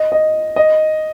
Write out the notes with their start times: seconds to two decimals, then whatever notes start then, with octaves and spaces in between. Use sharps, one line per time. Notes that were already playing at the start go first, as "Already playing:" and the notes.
Already playing: D#5
0.12 D#5
0.56 D#5